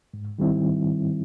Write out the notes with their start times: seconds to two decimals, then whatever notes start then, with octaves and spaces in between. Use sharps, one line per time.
0.14 G#2
0.38 D#3 G3 C4 E4